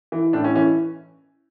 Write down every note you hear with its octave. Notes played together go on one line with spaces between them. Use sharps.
E3
A2 D4
C#4
E3 C#4